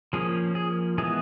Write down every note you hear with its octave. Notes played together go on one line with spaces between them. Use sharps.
F3 A#3 C#4 G#4
G#4
E3 G#3 B3 G#4